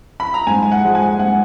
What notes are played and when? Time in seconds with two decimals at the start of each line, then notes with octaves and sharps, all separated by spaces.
0.20 B5
0.34 A#5
0.47 G#2 G#5
0.63 G#5
0.71 F#5
0.84 F3 G#3
0.95 G#5
1.18 G#2 F#5